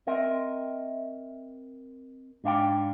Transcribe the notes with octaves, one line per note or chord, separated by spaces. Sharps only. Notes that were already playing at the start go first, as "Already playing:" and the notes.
C4 A#4 D#5 E5
G#2 D4 F5 G5